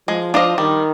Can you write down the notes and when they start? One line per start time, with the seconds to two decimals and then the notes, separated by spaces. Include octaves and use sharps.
0.08 F3 G#3
0.34 D4 F4 C5 D#5
0.58 D#3 G3